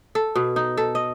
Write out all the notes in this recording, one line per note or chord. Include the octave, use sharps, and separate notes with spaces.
A4
B2
D#4
A4
D#5